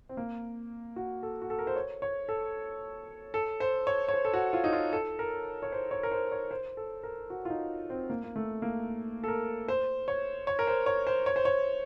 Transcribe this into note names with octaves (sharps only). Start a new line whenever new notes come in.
C4
A#3
F#4
A4
F#4
A4
A#4
C5
C#5
C#5
A4
A4
C5
C#5
C#5
C5
A4
F#4
F4
D#4
F4
A4
A#4
C#5
C5
C#5
A#4
C5
C#5
C5
A4
A#4
F#4
F4
D#4
C4
A#3
A#3
A3
A#3
A4
A#4
C5
C#5
C#5
A#4
C5
C#5
C5
C#5
C5
C#5